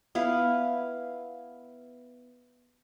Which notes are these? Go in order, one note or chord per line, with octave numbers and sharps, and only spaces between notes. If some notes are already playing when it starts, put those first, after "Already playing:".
B3 E4 B4 F5